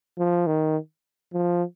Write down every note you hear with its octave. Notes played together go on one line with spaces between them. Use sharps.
F3
D#3
F3